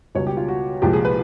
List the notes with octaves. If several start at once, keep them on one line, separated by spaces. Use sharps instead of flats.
C#2 B2 G3 C#5
G4
F4
F#4
C2 A#2 F3 G#3 G4
G#4
B4